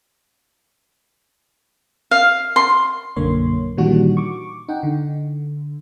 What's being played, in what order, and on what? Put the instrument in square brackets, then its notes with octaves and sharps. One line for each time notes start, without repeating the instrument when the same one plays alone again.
[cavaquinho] F5
C6
[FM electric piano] B1 F#2 D3 A#3 C#5 C6
A#2 D#3 E3 G3 D4 F#4
C#6 D6
D#4 F#5 G5
D3